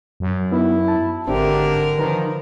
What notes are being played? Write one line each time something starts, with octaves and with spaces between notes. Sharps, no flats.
F#2
B3 D#4 E4
A5
G#1 D3 C4 D4 G4 A#4 E5
D#3 F3 B4 A#5